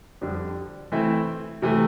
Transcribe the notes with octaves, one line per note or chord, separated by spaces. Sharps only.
F2 D3 G3 D4
E3 A3 C4 E4
C3 E3 A3